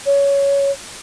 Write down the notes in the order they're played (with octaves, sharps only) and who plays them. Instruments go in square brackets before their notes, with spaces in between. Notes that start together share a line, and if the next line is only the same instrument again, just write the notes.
[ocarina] C#5